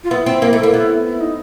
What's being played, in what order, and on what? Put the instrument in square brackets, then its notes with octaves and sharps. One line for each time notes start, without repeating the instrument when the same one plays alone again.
[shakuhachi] F4
[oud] B3 [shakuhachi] E4
[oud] C4
A#3
A3
A#3
[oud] B3 [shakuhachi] E4
[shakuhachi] E4
D#4